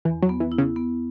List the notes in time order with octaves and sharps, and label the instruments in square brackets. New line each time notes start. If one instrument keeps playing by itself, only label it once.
[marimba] E2 [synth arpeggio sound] E3
[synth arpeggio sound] F#3
[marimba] B3
[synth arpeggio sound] E3
[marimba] E4
[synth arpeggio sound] C#3
[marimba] B3